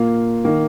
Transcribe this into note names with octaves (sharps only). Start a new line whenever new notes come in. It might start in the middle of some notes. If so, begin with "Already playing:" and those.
Already playing: A#2 A#3 F4
D#3 A#3